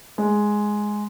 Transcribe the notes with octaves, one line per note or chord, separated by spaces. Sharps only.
G#3